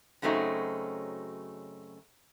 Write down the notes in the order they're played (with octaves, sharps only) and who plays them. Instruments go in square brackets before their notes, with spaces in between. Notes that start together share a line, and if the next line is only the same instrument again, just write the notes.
[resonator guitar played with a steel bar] F#2 C#3 F#3 A3 C4 D#4